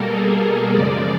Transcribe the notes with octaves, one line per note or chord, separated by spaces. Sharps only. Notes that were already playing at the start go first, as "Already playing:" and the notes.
Already playing: B2 G3 A#3 A4 A#4
G#4
A4
F#2 C#3 F3 G#3 D5